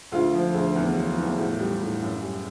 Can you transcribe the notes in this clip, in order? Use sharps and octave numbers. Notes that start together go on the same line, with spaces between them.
D2 F4
F3
D2
E2
F#3
E2
A2
G3
A2
F#2
G3